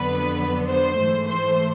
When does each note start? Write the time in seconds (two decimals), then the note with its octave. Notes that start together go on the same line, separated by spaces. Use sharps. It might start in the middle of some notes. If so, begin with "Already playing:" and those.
Already playing: F2 D3 F#3 B3 B4
0.68 C5
0.99 G#2 E3 A3
1.28 C5